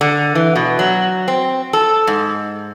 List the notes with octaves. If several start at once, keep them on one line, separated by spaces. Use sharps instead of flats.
D3
E3
B2
F#3
C4
A4
G#2